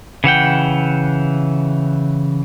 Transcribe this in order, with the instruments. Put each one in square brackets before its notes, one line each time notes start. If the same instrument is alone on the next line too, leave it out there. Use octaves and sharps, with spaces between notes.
[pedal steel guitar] C#3 E3 F#5 G5